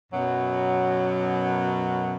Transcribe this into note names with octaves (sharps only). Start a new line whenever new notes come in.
F#2 B2 F#3